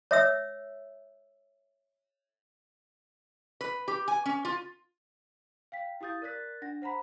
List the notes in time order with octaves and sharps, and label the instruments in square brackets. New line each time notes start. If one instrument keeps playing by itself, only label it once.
[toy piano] C#5 E5 E6
[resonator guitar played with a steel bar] B4
G4
G#5
C#4
F4
[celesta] F5 G5 B6
E4 G4 F5 D#6 G6 A6
A#4 D5 F#6 A6 B6
D4 F#5 A#6
C5 F#5 A#5 B5 B6